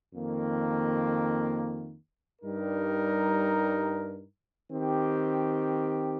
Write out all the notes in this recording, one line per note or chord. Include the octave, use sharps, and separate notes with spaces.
F2 D#3 A#3
G2 G3 D#4 A#4
D#3 C4 G4